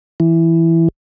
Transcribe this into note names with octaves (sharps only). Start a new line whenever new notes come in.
E3